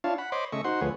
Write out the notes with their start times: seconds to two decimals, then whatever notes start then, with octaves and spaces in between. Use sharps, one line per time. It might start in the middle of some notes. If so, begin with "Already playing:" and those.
0.04 D4 E4 F4 C#5 F5 A5
0.18 F#5 B5
0.32 C5 C#5 D#5 B5 C6 D6
0.52 C#3 A3 D#5 E5 C#6
0.64 D#4 F#4 C5 F#5 C6
0.81 D2 F3 A3 G#4 B4 C#5